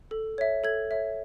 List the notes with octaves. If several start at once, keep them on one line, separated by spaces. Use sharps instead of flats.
A4
C#5 E5
A4 G#6
C#5 E5